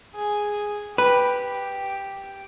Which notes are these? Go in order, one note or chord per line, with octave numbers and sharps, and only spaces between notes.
G#4
G4 B4